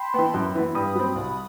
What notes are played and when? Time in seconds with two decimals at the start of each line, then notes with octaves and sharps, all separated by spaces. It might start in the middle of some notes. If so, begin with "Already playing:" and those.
Already playing: G5 A5 B5 C6
0.14 E3 B3
0.34 F#2
0.55 E3 B3
0.75 G2 B5 D#6
0.95 F#3 C4
1.15 C2